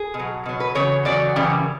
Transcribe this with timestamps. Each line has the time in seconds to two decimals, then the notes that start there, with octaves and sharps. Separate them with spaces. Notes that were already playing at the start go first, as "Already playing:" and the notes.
Already playing: G#4
0.14 B2
0.19 F#3
0.45 B2 F#3
0.60 B4
0.75 E2 C#3 F#3 C#5
1.05 E2 C#3 F#3 D5
1.36 F#2 C#3 E3 G3